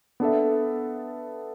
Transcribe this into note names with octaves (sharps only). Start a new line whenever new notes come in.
B3 D4 A4 E5